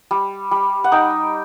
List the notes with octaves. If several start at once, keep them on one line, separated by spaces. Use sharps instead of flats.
G3
G3
F#5
D#4 G5